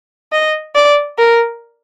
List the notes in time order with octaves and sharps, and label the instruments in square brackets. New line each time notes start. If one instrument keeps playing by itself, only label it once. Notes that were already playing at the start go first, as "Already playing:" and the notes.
[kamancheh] D#5
D5
A#4